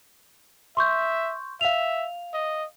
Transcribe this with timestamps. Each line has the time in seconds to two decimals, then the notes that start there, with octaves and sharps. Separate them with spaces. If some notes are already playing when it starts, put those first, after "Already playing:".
0.77 E5 C6 C#6 G6
1.61 E5 F5 F7
2.34 D#5